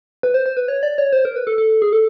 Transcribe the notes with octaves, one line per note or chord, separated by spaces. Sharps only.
B4
C5
C5
B4
C#5
D5
C#5
C5
A#4
B4
A4
A4
G#4
A4